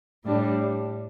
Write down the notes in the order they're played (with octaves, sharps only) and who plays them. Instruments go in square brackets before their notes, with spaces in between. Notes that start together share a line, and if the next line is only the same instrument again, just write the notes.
[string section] A2 G3 D4